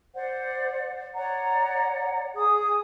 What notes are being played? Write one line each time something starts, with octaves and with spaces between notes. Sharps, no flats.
C5 D5 F#5
C#5 D5 F#5 A#5
G#4 D#6